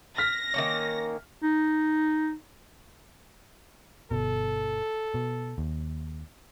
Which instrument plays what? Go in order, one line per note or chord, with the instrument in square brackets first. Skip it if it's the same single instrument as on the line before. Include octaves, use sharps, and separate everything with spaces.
[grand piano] F6 B6 [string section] A#6
[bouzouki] D#3 A#3 C#4
[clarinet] D#4
[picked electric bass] G1 B2 [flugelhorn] A4
[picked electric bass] B2
D#2